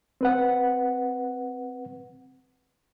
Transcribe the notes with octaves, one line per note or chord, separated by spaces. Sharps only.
C4 B4 F#5